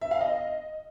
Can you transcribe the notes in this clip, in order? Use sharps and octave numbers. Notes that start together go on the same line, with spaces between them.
E5
F5
D#5